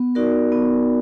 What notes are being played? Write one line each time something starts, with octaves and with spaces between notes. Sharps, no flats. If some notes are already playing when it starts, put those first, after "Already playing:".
Already playing: B3
D#4 F#4 A#4 D5
B3